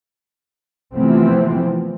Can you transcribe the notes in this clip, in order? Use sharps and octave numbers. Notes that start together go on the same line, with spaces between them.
C3 E3 F3 A3 B3 C4